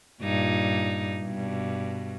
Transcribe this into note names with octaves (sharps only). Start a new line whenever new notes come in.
G2 A#2 D#4
G2 B2